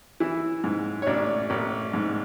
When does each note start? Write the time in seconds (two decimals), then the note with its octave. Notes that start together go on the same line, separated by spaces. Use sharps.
0.20 E3 E4
0.64 G#2
1.02 C#5
1.07 A1 D4 D5
1.50 A1
1.93 G#2